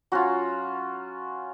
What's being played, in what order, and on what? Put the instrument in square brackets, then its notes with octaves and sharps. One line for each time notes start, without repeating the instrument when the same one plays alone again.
[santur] F#3 C#4 F4 F#4